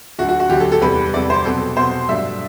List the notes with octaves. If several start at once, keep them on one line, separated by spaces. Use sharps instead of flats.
D2 D3 F#3 F#4
F#4
F#4
D2 D3 F#3 G4
A4
A4
E2 C3 G3 B4
E2 C3 G3 D5
C5
B2 F#3 C4 A4
B2 F#3 C4 C5
G2 F#3 A3 D4 E5